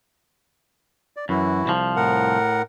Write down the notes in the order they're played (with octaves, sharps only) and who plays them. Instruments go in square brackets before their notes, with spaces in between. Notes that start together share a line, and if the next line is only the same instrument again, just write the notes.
[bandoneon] D5
[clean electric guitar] F#2 [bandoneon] E3 E4 F#4
[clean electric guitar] C2 F3
[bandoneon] A2 A#4 F#5